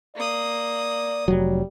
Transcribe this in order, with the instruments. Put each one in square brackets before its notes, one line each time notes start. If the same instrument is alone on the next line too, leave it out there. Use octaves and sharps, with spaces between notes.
[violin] A#3 D#6 [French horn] D5
[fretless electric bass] F1 F#3 [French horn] G3